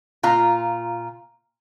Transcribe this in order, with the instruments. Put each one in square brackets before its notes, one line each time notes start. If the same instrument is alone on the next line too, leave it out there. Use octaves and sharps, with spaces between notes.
[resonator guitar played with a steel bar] A#2 F4 A#5